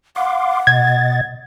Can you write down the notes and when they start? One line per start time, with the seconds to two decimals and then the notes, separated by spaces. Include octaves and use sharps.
0.16 F5 F#5 C6 D6
0.67 B2 D#5 G#6 A6